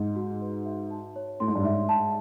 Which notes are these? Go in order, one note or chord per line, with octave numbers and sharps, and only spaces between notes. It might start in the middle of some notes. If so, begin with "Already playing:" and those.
Already playing: G#2 D#4 D#5
F#4
B4
E5
A5
C#5
A2 C6
G#2
G2
G#2 E5
A5